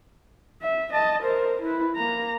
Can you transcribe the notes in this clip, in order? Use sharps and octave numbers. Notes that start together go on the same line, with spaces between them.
E5
D#5 A5
A#4 C5
E4 B4
A#3 A#5